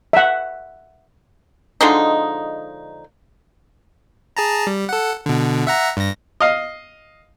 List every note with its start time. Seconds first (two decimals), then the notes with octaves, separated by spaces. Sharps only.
0.13 E5 F#5
1.81 D3 F3 G#3 D#4
4.37 G#4 A5 A#5
4.67 G3
4.89 A4 F#5
5.26 B2 D3
5.67 E5 F#5 A#5
5.97 G2 A#6
6.40 D#5 F5